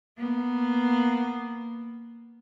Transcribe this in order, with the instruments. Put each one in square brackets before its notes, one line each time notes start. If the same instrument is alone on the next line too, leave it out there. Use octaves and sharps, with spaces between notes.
[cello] A#3 B3